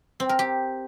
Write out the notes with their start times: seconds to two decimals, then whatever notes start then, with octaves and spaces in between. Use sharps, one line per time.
0.20 C4
0.29 A#4
0.39 G4